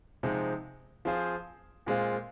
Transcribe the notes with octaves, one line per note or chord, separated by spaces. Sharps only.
C3 F3 G#3 C4 D#4
F3 C4 F4 G#4 C5
A#2 G#3 C4 F4